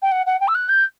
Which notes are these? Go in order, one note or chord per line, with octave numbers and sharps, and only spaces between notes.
G5
F#5
F#5
G5
E6
F#6
G6